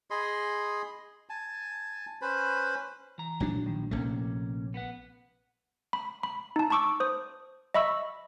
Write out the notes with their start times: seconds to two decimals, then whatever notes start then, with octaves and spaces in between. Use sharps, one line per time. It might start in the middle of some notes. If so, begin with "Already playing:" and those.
0.10 G#4 D#5 B5 C6
1.29 G#5 A5
2.22 C#4 B4 C5 B5
3.18 E3 A#5
3.40 A#1 F#3 D4
3.66 A2 D#3
3.91 A#1 C3 A3 A#3 C#4
4.74 B3 B4 F#5
5.93 B5
6.23 B5
6.56 D#4 A5
6.70 A5 B5 C#6 D6 E6
7.00 C5 D#6
7.74 D#5 E5 B5 C#6 E6